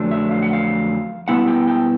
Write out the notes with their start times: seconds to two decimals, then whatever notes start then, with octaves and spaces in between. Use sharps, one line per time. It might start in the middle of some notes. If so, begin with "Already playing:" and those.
Already playing: F2 D3 F#3 A3 D4
0.11 E5
0.31 F5
0.42 F#5
0.53 F5
1.28 B2 G3 B3 E4 F#5
1.48 G5
1.68 G5